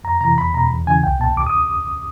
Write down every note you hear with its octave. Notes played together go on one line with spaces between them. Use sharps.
F2 A#5
C3 E3 A#5
E2 B5
B2 A#5
E2
C#3 E3 G#5
C2 G5
A#2 A5
D#2 D6
D#6